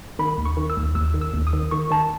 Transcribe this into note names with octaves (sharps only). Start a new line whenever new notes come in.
D#3 B5
D#2
C#6
D#3
E6
D#2
D#2 E6
D#3
E6
D#2
D#6
D#3
D#3 C#6
D#3 A5